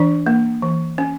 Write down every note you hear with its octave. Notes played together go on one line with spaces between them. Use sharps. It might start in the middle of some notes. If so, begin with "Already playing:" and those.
Already playing: E3 D4 D5
A#3
E3
C#4